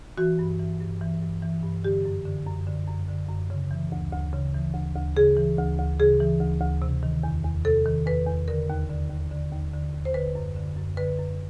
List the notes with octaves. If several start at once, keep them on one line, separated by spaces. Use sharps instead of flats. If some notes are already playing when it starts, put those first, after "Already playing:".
E3 F#4
G2
E3
G2
E3
G2
E3
G2
D3 G4
F#2
D3
F#2
D3
F#2
D3
F#2
C#3
E3
D2
D2
C#3
E3
D2
D2
C#3 G#4
E3
D2
D2
C#3 G#4
E3
D2
D2
C3
D#3
E2
E2
C3 A4
D#3
E2 B4
E2
D3 A#4
D#2
D3
D#2
D3
D#2
D3
D#2
C5
D3 B4
F#2
D3
F#2
D3 B4
F#2